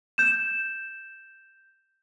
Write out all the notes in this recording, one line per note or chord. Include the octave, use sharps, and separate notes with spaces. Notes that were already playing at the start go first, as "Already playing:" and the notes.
G6 E7